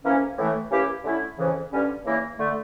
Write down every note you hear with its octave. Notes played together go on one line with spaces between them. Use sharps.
F2 E3 A#3 C#4
A2 E3 A3
E3 A#3 C#4 E4 G4
D3 A3 C#4 E4
F2 C#3 E3
G2 D3 G3 C#4
E2 C#3 E3 A#3
D3 A3